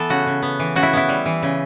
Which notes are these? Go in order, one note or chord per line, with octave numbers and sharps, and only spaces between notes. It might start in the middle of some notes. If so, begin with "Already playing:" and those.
Already playing: E3 B3 A4
C#3 F#4
C#3
B3
E3
C#3 F#4
E4
B3 E4
G3
E3
C#3